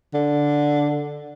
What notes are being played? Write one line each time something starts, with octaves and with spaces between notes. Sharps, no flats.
D3